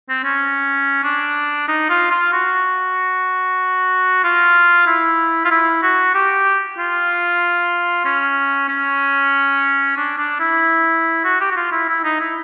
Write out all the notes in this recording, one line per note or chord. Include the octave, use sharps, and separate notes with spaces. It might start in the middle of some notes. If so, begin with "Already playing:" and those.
C4
C#4
D4
D#4
F4
F4
F#4
F4
E4
F4
E4
F#4
G4
F4
C#4
C#4
D4
D4
E4
F#4
G4
F#4
F4
E4
E4
D#4
E4